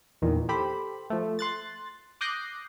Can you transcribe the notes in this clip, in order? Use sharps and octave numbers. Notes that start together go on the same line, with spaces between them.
E2 A#2 D#3 E3
G4 A4 C5 B5
F3 A3
C6 F#6 A6
D6 D#6 F#6 G6 A#6 C7